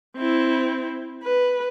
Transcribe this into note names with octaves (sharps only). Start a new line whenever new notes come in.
C4 E4
B4